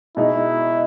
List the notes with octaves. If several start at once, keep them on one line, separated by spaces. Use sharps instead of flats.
B2 G#3 D#4 E4 G#4